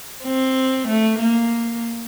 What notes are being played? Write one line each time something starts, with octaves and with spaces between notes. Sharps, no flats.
C4
A3
A#3